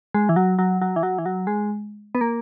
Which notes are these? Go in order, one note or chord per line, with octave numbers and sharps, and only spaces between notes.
G#3
E3
F#3
F#3
F#3
E3
F#3
E3
F#3
G#3
B3
A#3